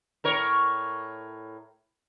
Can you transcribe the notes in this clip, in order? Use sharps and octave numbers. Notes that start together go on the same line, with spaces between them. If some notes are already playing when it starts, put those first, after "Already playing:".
A2 A#4 C#5